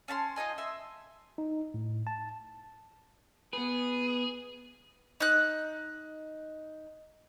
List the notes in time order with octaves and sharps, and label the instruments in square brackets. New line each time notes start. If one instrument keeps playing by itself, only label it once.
[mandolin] C#4 A5 B5 C6
D#4 F4 D#5 G#5
E5 C6
[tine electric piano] D#4
A2
A5
[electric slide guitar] B3 B4 [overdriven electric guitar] G#4
[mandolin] D#4 F#6